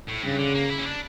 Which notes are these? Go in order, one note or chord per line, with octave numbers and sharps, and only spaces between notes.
A2
G2 C#3
D3
A#3
E4
C#4
D4